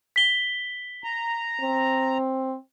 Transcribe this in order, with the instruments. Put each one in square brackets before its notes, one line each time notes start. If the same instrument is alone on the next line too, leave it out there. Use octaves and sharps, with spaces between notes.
[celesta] B6 G7
[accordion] A#5
[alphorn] C4